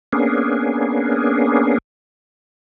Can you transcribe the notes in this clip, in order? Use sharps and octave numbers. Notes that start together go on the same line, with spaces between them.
A#3 B3 C#4 D4 G#4